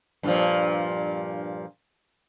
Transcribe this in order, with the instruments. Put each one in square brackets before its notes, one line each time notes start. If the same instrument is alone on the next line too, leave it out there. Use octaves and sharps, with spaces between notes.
[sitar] G2 A#2 F3